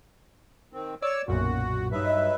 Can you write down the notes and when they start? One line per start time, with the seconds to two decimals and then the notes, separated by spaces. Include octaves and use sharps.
0.73 D#3 C4
1.02 C#5 D5 E6
1.28 B1 F#2 A#2 F#4
1.92 G2 F#3 D#4 B4 E5
2.06 D#5